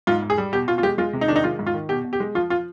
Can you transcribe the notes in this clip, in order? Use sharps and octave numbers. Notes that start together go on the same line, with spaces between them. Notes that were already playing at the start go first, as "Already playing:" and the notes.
G#2 F4
G#2
G#4
G3
B2 G4
B2 F4
F4
G#3 G4
G#3 F4
C3
D#4
D#3 D4
D#4
G#3 F4
G#2
F4
D#3
B2 G4
B2
G4
G#3
F3 F4
F4